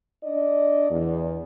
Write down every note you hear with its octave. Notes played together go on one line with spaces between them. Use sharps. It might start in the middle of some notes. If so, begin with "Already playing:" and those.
D4 D5 D#5
E2